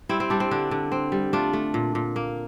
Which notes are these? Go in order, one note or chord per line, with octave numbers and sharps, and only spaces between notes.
G3 C4 E4
C4
G3 D4
C4
D3 D4
D3
C4
G3
A3 D4 F4
A3
A#2
A#2
A#3